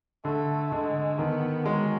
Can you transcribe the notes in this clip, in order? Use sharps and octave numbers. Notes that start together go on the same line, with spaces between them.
D3 A3
D3 G#3
D#3 B3
F#3 G#3